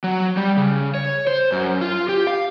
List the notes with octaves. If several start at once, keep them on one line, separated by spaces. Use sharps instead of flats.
F#3
G3
C#3
C#5
C5
F#2
F4
G4
F5